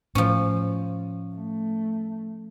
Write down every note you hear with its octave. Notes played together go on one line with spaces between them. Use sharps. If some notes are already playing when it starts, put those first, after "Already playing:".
A2 F3 C#4
A3